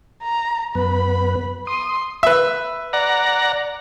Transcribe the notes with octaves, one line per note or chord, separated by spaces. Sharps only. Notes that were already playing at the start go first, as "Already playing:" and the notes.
A#5
F#2 B3 B4 B5
C6 D#6
B4 E5
D5 F#5 A#5